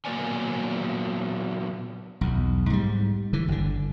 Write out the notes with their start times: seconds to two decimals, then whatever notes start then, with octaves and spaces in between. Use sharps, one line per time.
0.05 A#2 F#3 A#3 B3 D5 G#5
2.21 B1 E2
2.70 G#2 G3
3.33 D3 E3
3.48 G1 D3